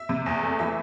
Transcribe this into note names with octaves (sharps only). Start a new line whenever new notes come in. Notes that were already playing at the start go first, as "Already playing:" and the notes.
Already playing: E5
C3
E2
A3
E3 E5